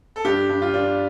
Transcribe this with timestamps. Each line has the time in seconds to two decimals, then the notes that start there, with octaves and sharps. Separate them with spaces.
0.16 A4
0.25 G2 G4
0.49 G2
0.62 F4
0.74 D4